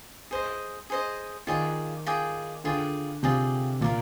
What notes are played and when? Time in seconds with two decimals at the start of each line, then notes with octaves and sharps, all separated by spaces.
0.31 G#4 C5 D#5
0.90 G#4 C5 D#5
1.47 D#3 F4 G#4 D5 G5
2.06 F4 G#4 D5 G5
2.64 D3 F4 G#4 D5 G5
3.23 C3 F4 G#4 D5 G5
3.81 A#2 F4 A#4 D5